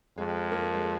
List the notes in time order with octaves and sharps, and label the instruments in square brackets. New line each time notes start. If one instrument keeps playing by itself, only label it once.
[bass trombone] F2 [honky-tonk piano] G#3
[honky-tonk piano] A#3
G#3